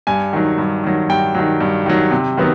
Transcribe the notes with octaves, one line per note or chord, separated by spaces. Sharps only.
G2 G#5
D#3 F#3
G2
D#3 F#3
G2 G5
D#3 F#3
G2
D#3 F#3
C3
D#3 F#3 B3